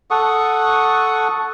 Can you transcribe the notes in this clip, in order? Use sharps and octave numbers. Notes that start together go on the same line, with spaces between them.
A4 F#5 C#6 D#6